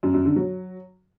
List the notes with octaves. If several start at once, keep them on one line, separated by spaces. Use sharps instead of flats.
F#2
F#2
D3
F#3